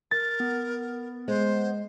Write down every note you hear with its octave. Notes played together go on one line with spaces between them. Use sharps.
A#4 A6
B3
G#3 C5